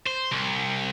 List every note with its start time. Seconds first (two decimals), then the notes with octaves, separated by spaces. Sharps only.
0.06 C5
0.32 C2